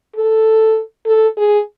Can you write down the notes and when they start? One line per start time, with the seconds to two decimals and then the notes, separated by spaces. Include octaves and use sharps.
0.15 A4
1.05 A4
1.37 G#4